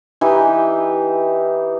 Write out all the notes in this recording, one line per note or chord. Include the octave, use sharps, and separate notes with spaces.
E3 D#4 G4 G5